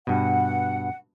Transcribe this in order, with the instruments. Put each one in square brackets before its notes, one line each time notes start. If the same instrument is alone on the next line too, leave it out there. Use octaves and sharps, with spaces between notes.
[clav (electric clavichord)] G2 B2 [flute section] F#5